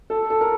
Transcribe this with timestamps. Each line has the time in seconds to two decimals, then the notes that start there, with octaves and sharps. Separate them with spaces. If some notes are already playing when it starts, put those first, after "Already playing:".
0.10 A4
0.30 A4
0.41 A#4